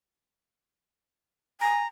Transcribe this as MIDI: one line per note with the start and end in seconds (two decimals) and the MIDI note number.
1.61 1.82 80
1.61 1.87 82